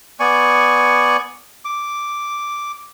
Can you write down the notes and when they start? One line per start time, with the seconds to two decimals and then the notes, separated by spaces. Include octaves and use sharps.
0.20 B3 D5 G#5 C#6
1.65 D6